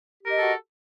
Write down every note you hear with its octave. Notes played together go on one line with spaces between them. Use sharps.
F#4 G4 A4 A#4 D#5